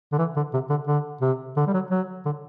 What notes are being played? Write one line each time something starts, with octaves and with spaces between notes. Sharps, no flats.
D3
E3
D3
C3
D3
D3
C3
D3
G3
F#3
F#3
D3